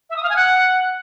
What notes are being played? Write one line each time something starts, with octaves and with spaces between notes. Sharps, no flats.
E5
D#6
F5
G#5
F#5